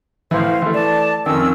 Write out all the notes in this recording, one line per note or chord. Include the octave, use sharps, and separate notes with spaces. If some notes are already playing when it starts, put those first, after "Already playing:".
A2 E3 C5 F5
E3 A3
D5 A5
F2 D#3 C#4 E6